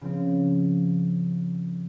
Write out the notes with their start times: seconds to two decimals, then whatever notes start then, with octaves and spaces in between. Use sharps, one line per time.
0.01 C#3 F3 C4